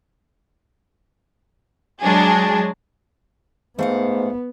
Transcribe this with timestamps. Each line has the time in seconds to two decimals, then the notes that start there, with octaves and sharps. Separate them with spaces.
2.03 F#3 G#3 D4 G#4
3.79 G#2 A3 B3 F5 F#5